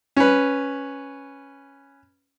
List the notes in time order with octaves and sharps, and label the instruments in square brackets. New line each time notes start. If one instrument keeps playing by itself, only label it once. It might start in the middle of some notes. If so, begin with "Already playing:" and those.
[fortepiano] C#4 B4